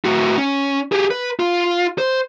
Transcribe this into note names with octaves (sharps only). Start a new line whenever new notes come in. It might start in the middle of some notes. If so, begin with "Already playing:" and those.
A2 F#4
C#4
G4 G#4
B4
F4
C5